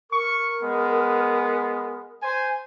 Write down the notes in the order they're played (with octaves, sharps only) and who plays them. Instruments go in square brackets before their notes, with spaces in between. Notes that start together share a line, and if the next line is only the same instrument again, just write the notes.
[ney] A#4 [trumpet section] C#6
[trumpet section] G#3 B3
C5 G#5